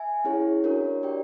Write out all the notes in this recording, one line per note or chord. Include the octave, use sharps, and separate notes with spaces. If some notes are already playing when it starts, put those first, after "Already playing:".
Already playing: E5 G#5
C#4 E4 G#4 C#5
D4 F#4 A#4 C#5
G4 A#4 D5 G5